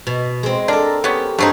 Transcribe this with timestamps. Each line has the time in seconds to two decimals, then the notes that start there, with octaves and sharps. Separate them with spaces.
0.07 B2
0.43 G#3 C4
0.68 D4 A4 A#4
1.04 B3 C#4 G4
1.39 G2 A3 C4 D#4 G#4 D#5